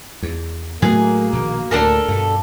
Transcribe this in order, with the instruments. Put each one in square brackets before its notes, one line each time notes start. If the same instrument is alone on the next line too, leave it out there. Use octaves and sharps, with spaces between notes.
[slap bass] E2
[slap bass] A2 F#3 A3 [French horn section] A#3 [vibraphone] F#4 [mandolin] G#4
[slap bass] A#1 B2 D#3
[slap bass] D2 A2 [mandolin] D4 A4 A#4
[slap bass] G2 B2 [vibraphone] F5 A5